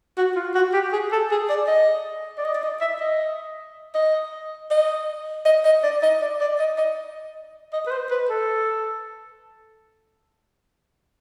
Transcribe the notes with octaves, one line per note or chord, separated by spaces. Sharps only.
F#4
F4
F#4
G4
G#4
A4
G#4
D5
D#5
D5
D#5
D5
D#5
E5
D#5
D#5
D#5
D#5
D#5
D5
D#5
D5
D5
D#5
D#5
D#5
B4
C5
B4
A4